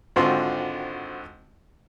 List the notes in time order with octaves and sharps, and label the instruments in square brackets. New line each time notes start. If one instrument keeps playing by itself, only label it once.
[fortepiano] G#1 D3 C4 F4 F#4 C6